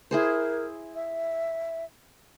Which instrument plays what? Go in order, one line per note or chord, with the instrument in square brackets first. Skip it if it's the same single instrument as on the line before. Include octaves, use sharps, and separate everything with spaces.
[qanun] E4 G#4 C5 [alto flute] A#4
[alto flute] E5